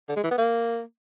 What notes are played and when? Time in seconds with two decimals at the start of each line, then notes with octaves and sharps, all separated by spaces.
0.09 D3
0.16 G#3
0.23 E3
0.31 B3
0.38 A#3